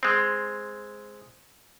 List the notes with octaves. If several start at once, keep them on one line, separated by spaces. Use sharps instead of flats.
G#3 C4